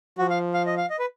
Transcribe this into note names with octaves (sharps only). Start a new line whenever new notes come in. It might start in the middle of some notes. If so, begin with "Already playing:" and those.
F3 F#4
F5
F5
D#5
F5
D#5
B4